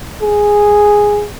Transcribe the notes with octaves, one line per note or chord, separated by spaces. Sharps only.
G#4